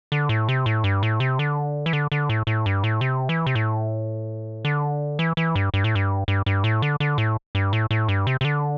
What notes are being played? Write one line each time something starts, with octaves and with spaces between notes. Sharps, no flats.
D3
A2
C3
A2
G2
A2
C3
D3
E3
D3
D3
A2
A2
G2
A2
C3
E3
C3
A2
D3
E3
E3
G2
G2
A2
G2
G2
G2
A2
D3
D3
A2
G2
A2
A2
G2
C3
C3
D3